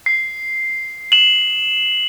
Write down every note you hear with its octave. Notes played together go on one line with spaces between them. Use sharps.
C7
E7 F#7